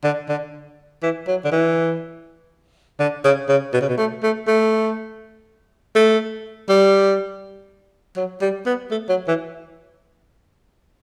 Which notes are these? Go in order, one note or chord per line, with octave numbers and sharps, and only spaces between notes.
D3
D3
E3
F#3
D3
E3
D3
C#3
C#3
B2
C#3
B2
A3
A3
A3
A3
G3
F#3
G3
B3
A3
F#3
E3